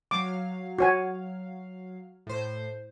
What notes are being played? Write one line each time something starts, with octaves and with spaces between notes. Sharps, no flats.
F#3 F5 D6
F#4 C#5 G#5
A2 C5